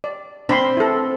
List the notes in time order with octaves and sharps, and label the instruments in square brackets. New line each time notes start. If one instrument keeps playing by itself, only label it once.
[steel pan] D5
[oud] C4 [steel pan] D4 B5 C6
[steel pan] E4 A4